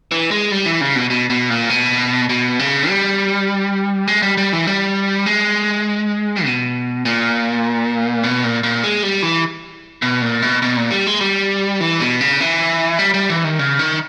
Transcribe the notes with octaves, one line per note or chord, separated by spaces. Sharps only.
E3
G#3
G3
E3
C#3
B2
B2
B2
A#2
B2
B2
C#3
G3
G#3
G3
G3
E3
G3
G#3
B2
A#2
B2
A#2
A#2
G#3
G3
E3
B2
A#2
B2
B2
A#2
G3
G#3
G3
E3
B2
C#3
E3
G3
G3
E3
D#3
C#3
D#3